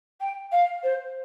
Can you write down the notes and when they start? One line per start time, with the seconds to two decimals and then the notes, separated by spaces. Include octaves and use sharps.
0.20 G5
0.52 F5
0.83 C5